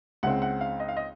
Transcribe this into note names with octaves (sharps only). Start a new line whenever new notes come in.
C#2 C#3 G#3 C4 F#5
F#5
F5
D#5
F5
D#5